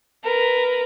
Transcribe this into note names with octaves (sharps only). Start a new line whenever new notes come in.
A#4 B4